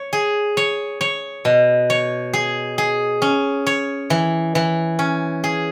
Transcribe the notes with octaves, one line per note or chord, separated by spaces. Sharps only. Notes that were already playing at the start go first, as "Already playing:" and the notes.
Already playing: C#5
G#4
C#5
C#5
B2
C#5
G#4
G#4
C#4
C#5
E3
E3
C#4
G#4